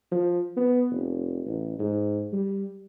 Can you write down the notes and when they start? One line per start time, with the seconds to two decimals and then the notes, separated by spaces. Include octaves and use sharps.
0.11 F3
0.57 B3
0.91 F1
1.46 A1
1.79 G#2
2.33 G3